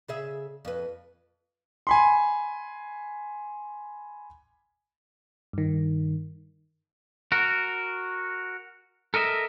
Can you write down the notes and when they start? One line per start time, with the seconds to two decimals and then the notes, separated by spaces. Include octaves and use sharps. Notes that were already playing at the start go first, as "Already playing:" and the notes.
0.08 C#3 G#4 E5
0.65 F2 B4
1.87 G#5 B5 C6
5.53 G2 D#3
7.32 F#4 A#4
9.14 A4 A#4 D#5 E5